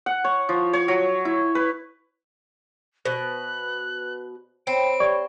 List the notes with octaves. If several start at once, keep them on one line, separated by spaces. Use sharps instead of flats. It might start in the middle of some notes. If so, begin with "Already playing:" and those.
F#5
C#5
F3
C#5
F#3
E4
B4
B2 B4 C5 F#6
C4 C5 C#5 B5 D7
G4 D5 C#6